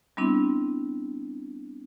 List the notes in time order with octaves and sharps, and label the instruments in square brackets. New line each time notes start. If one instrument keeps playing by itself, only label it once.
[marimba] G3 B3 C4 D4 E4